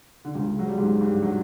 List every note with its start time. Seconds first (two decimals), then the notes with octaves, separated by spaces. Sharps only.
0.25 D3
0.35 C#2 C#3
0.59 F#3
0.69 G3
0.78 G#2 G#3
1.01 G2 G3
1.23 F#3